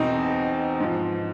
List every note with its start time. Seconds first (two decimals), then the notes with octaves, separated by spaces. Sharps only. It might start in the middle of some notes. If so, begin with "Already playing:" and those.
Already playing: E2 B2 C4 D#4
0.80 G#2 F3